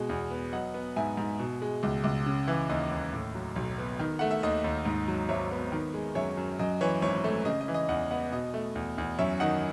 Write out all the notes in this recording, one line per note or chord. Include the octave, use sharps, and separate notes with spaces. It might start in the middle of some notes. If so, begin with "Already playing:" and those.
Already playing: B2 G#3
E2
B3
F#3 D#5 F#5
B3
G#2 E5 G#5
G#2
B2
G#3
C#2
C#2
C#3
E3
D#2 D#5
D#2
A2
F#3
B1
B3
D#3
A3 F#5
E5
D#2 D#5
D#2
G#2
F#3
G#1 C#5 E5
B3
D#3
G#3
F#2 C#5 E5
F#2
F#2 D#5
E3 C#5
G#1 C#5
A3
C#3 D#5
D#5
E3
D#5
E2 D#5 F#5
B3 D#5 F#5
B2 D#5
A3
E2
E2
F#2 C#5 E5
D#3 D#5 F#5